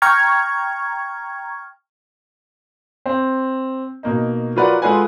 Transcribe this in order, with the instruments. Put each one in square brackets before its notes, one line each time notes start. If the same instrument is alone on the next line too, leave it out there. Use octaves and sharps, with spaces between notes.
[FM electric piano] G5 A#5 C#6 F6 G#6
[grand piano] C4
B2 A#3 D#4
F#3 F4 A#4 B4 D5 F#5
G#3 F4 A4 B4 F#5 G#5